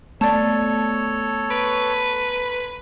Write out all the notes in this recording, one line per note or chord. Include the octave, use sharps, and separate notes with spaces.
A3 B3 A4 C#5 D5 A5
B4 D7